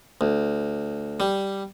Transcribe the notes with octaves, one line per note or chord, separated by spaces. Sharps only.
D2
G3